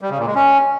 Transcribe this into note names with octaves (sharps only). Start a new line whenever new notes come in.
G3
C#3
A#2
G#3
C#4